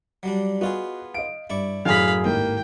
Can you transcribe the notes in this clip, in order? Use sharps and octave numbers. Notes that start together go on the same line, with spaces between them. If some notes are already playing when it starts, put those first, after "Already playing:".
F#3 G3 D4
B3 F4 F#4 G#4 D#5
D#5 F5 D7
G2 E4 D5 C#6
F#2 A2 G#4 F5 B5
G#1 D#2 A2 A#3 E4 G5